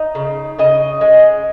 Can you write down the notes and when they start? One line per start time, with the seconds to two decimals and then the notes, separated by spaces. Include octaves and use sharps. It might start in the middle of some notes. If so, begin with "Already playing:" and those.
Already playing: D#4
0.15 C#3
0.59 C#3 D#5
1.01 G#3